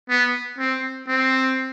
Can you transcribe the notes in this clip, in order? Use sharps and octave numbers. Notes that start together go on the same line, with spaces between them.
B3
C4
C4